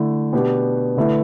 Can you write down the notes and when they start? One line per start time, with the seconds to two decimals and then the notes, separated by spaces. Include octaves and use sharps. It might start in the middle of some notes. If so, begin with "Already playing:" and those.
Already playing: D3 A3 E4
0.33 B2 B3 D4 G4
0.97 D3 A3 E4 B4 E5